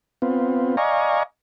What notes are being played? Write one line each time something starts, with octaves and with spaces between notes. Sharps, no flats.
B3 C4 F4
D5 D#5 F5 G#5 A#5 C#6